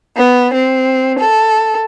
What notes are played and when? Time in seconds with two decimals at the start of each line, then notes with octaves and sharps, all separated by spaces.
0.17 B3
0.53 C4
1.18 A4